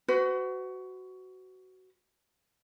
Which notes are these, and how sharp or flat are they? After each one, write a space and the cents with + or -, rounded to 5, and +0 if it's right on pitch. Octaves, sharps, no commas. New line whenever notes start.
F#4 +15 B4 +45